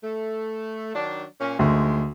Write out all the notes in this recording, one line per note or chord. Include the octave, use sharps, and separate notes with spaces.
A3
D#3 F#3 D4
A#2 C#4
D2 D#3 F3 G#3